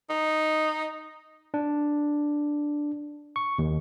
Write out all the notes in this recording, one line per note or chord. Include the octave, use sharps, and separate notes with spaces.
D#4
D4
C#6
D#2